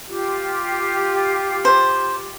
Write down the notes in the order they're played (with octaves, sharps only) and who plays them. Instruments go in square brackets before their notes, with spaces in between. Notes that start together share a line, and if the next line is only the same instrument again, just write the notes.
[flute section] F4 G4
[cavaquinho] C5